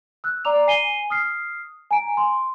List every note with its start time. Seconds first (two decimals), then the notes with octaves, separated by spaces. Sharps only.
0.24 E6 F#6
0.45 D5 A#5 D6 F7
0.67 G#5 C7 D#7 G7
1.10 D#6 F6 C7
1.91 G#5 A#5 D7
2.17 C6